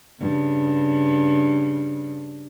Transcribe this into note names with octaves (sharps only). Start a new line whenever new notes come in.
G2 C#3